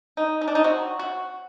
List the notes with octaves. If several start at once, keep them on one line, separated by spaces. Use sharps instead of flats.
D#4
D#4
D4
D#4
F#3 C4 F#4
F#4